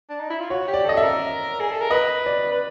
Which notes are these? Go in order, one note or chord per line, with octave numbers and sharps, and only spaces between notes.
D4
D#4
E4
F4
F#4 C#5
G4
D5
A4 D#5
E5
A#4
G#4
A4
A#4
B4 D#5
D5
B4